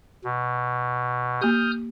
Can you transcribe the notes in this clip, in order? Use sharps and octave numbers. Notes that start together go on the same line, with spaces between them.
B2
A#3 G4 D#6 F6 G6